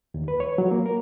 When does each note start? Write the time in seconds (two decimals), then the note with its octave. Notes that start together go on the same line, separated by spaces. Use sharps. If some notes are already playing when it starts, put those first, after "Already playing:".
0.14 D#2
0.28 B4
0.40 C#5
0.58 F#3
0.71 A#3
0.86 A#4